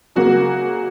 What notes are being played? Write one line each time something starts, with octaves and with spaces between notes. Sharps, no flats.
C#3 F#3 A#3 F#4